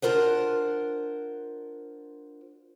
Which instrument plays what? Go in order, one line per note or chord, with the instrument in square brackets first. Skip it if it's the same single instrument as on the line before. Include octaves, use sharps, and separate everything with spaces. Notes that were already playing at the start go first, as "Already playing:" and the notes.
[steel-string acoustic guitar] D4 F4 A#4 C5 F#5